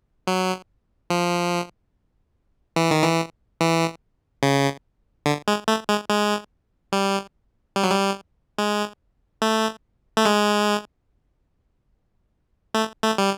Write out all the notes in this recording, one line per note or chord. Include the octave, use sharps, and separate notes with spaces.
F#3
F3
E3
D#3
E3
E3
C#3
D3
G#3
A3
G#3
G#3
G3
G3
F#3
G3
G#3
A3
A3
G#3
A3
A3
G3